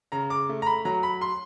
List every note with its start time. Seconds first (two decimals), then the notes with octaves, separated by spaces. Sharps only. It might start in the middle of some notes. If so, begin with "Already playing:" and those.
0.12 C#3 A#5
0.30 D6
0.49 A3
0.62 A#5
0.66 B5
0.85 F#3 A#5
1.03 B5
1.21 C6